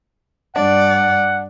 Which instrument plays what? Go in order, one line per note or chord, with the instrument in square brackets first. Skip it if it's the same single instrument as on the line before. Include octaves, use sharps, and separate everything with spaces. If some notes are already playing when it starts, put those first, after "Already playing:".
[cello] G2 D5 [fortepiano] D4 [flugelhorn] F#5